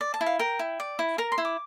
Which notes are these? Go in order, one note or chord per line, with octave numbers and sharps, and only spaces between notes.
D5
A5
E4
F5
A#4 G5
E4
D5
E4
A#4 A#5
C6
E4
D6